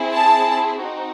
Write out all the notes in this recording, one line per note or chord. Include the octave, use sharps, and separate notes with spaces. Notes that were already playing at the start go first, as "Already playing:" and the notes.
Already playing: C4 E4 G#4
A5
C4 D#4 F#4